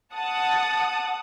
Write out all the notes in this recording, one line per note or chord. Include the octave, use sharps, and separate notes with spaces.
F#5 A5 D#6